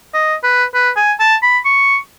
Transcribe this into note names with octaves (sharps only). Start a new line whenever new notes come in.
D#5
B4
B4
G#5
A5
B5
C#6